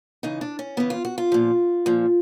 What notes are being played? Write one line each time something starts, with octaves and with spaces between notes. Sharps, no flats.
C#3 E3 D#4
D4
C#4
C#3 E3 B3
F4
F#4
F4
A#2 F3
A#2 F3